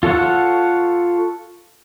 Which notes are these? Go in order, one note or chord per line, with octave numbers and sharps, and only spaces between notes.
F4 A4 C#5 F#5